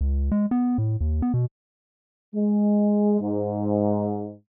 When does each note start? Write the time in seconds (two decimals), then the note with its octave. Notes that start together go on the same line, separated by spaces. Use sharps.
0.01 C#2
0.32 G#3
0.51 B3
0.78 A2
1.01 D#2
1.22 B3
1.34 B2
2.34 G#3
3.21 G#2